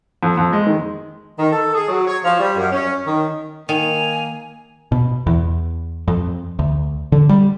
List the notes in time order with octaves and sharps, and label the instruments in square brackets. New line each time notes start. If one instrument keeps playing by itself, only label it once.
[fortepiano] F2
F2
G#3
D#3
[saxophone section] D#3
A4
G#4
F#3
C#5
F3
G3
F#2
C#4
D#3
[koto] D#3 [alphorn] A#3 [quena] G#5 [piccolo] F7
[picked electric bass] B2
E2
F2
D2
D3
G3